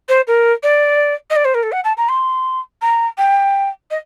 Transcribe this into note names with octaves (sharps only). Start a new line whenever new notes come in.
C5
A#4
D5
D#5
D5
C5
A#4
A4
F#5
A5
A#5
C6
A#5
G5
D#5